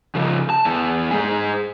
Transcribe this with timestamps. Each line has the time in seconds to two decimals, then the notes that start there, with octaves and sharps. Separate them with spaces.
0.15 C#3 F3
0.50 A5
0.65 E2 E3
1.11 G#2 G#4